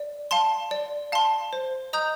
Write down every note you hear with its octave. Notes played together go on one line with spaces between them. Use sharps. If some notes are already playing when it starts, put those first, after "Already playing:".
Already playing: D5
F5 A5 C6
D5
F5 A5 C6
C5
D#5 A#5 D#6 G6